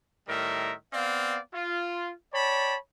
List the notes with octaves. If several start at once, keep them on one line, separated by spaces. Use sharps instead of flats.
A2 D#3 G3 A#4 E5
B3 C4 D5 F5
F4
C#5 D5 G5 A5 B5